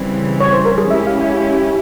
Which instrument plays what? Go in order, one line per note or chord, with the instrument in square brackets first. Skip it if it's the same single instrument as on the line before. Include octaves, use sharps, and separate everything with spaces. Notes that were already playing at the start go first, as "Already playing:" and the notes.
Already playing: [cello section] C#3 E3 G3 C4
[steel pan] C#5
C5
A#4
G#4
[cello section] G#3 C#4 E4 G4 [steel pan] E5
[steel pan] F5
E5